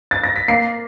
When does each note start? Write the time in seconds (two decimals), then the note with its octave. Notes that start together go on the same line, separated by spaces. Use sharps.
0.11 A6
0.24 A#6
0.36 B6
0.48 A#3 C7